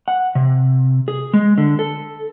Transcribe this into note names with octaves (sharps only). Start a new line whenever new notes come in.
F#5
C3
G#4
G#3
D3
A4